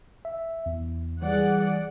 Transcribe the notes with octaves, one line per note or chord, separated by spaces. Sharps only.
E5
E2
E3 G3 G#4 D5 F#5